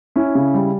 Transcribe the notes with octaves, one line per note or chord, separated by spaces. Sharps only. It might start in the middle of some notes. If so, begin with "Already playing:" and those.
C#4 E4
C#3
G3